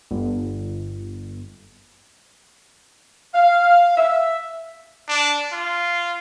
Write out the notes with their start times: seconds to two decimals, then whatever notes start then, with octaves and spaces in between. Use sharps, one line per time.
0.11 G1
3.34 F5
3.97 E5
5.08 D4
5.52 F4